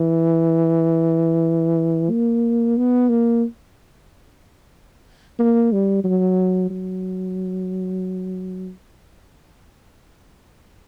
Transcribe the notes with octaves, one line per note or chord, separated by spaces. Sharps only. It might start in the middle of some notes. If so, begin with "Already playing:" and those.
Already playing: E3
A#3
B3
A#3
A#3
G3
F#3
F#3